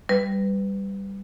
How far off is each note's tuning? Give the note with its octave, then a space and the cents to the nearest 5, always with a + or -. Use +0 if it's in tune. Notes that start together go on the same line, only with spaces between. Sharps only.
G3 +0 B4 +15